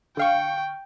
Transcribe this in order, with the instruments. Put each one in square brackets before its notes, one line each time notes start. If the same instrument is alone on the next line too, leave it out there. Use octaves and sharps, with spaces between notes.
[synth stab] D3 F5 C#6 [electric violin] G5